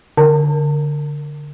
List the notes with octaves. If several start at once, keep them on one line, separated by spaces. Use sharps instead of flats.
D3